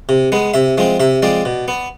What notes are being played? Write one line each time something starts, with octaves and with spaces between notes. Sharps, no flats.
C3
G#3 B3
C3 E5
F3 G#3 C4
C3 E5
F3 G#3 C4 D5
B2
B3